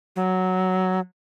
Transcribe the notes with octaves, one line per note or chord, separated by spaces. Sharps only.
F#3